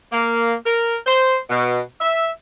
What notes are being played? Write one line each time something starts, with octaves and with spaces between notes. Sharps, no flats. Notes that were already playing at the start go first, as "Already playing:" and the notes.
A#3
A#4
C5
B2
E5